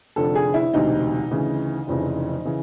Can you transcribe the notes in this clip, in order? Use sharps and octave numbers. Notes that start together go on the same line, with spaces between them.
F1 F2 D3 A4
G#4
E4
E1 D2 C3 D#4
D2 C#3 E3
F1 F2 C#3 E3
C#3 E3